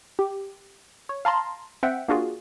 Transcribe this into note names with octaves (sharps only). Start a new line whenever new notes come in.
G4
C#5
F5 A5 A#5 C6
C4 E5 F#5 G5
A#3 D4 F4 F#4 G#4